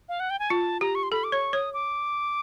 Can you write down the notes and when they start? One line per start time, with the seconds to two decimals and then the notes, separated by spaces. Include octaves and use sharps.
0.09 F5
0.20 F#5
0.30 G5
0.39 G#5
0.50 F4 A5
0.81 G4 A#5
0.95 C#6
1.03 C6
1.12 A4 B5
1.24 D6
1.32 C#5 C#6
1.53 C#5 D#6
1.74 D6